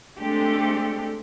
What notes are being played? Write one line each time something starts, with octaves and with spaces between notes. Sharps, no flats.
G#3 A3 C4 D4 G4 A4